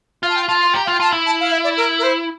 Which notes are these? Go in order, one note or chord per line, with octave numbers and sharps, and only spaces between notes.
F4 F5
A5
G5
F4 A5
C6
G4 A#5
F4 F5
G5
F4 A5
E4
A5
F5
E5
D5
A#4
A#4
C5